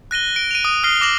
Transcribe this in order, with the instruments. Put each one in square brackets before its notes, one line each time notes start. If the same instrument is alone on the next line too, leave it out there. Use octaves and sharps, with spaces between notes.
[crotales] F#6 A#6 D#7 G7
D7
D#7 F7
D#6
D#6 F6 A#6 C7 G7
D6 A#6 F7 F#7